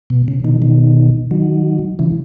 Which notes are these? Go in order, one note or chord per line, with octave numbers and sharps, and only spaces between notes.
B2
C#3
B2 D#3
B2 D#3
D#3 F#3
C#3 E3